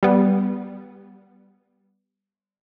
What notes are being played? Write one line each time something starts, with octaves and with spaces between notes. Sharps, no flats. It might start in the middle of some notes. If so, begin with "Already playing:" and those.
G3 B3